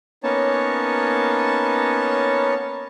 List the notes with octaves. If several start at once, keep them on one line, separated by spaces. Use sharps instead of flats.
A#3 B3 C#4 D#4 C#5 A5